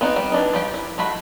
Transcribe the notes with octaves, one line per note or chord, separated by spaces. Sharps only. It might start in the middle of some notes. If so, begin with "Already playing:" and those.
B3 C4 D#4 F#4
G3
E3 D4 D#4
F3 G3 G4
E4
G#3 A3 F#4 B5